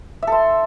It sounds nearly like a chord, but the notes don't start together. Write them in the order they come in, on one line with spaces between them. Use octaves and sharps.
E5 A4 C6